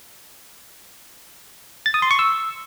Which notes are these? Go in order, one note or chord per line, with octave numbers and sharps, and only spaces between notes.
A6
D#6
C6
C#6
E6